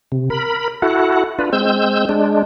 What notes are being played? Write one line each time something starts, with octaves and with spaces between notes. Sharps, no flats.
C3
A#4 B5
E4 F#4 A4 F#5
D4 F4 B4
G#3 C4 E6 G6
G#3 D4